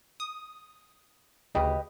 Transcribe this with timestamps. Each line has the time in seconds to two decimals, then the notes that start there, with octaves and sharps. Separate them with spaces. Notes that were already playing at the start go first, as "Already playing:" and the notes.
0.20 D#6
1.55 D2 C#3 G4 B4 D#5